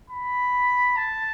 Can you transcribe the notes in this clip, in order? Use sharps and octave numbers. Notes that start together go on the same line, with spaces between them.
B5
A5